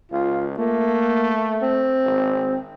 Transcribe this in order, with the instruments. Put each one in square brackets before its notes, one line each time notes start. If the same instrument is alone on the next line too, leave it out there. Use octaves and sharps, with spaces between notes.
[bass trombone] C#2 [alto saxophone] F4
[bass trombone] A3 [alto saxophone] A#3
[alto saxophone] C4
[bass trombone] G#1